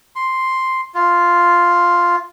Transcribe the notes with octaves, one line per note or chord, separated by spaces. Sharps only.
C6
F4